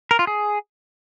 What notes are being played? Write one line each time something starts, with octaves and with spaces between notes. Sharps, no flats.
A#4
F4
G#4